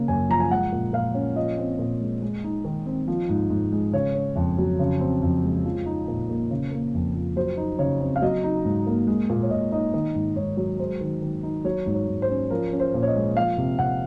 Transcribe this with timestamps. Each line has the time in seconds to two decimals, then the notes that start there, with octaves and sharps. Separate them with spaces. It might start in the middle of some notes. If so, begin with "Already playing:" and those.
Already playing: C#3 A#3
0.08 F#2 G#5
0.30 F3 A#5
0.40 G#5
0.51 G#3 F#5
0.72 A#2
0.93 A#2 F5
1.14 C#4
1.36 F3 D#5
1.58 C4
1.79 A#2
2.01 G#3
2.22 G#3
2.44 D#4
2.65 D#3
2.86 C4
3.08 F3
3.29 G#2
3.50 G#2
3.72 G#3
3.93 C#3 C#5
4.14 C#4
4.36 F2
4.58 F#3
4.79 C#3
5.00 C4
5.22 F2
5.43 G#3
5.66 F3
5.86 D#4
6.08 A#2
6.29 A#3
6.50 C#3
6.72 A#3
6.94 F2
7.15 F3
7.36 F#3 C5
7.57 D#4
7.79 C#3 C#5
8.00 C4
8.16 F5
8.22 F#3 D#5
8.44 D#4
8.65 G#2
8.87 A#3
9.07 G#3
9.30 A#2
9.43 C#5
9.50 A#2 D#5
9.72 D#4 D#5
9.93 D#3 D#5
10.15 G#2
10.36 G#2 C#5
10.57 F#3
10.79 G#3 C5
11.01 D#3
11.22 D#3
11.43 D#4
11.64 F#3 C#5
11.86 G#2
11.94 C#5
12.08 G#2
12.22 C5
12.30 C#4
12.50 F3 A#4
12.73 C#4
12.80 C5
12.94 A#2
13.03 C#5
13.08 D#5
13.16 G#3
13.36 F3 F5
13.58 C3
13.79 C3 F#5